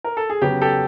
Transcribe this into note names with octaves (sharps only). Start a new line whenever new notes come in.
A#4
A4
G#4
C#3 F#3 B3 G4
G4 A4